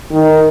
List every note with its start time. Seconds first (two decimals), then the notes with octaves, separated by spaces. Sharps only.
0.12 D#3